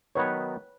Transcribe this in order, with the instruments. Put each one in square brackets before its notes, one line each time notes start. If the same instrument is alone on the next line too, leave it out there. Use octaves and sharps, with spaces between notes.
[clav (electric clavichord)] D#3 F#3 B3 D#4 [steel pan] B4 C#5